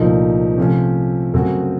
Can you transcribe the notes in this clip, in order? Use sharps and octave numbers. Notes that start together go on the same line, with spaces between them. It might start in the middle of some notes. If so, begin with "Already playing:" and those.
Already playing: C2 A#2 F3 A3 D#4
C3 F3 A3 C#4
F#2 C#3 A3 C4 F#4